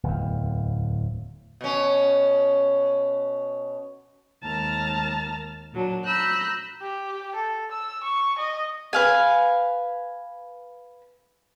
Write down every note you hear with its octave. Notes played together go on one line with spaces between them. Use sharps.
D1 E2
B2 C#4
D#2 G#3 A5 A#5 F6
A#2 F#3 D4
A#5 B5 E6 F#6 G6
G4
A4
E6
C#6
D#5
B4 F5 G#5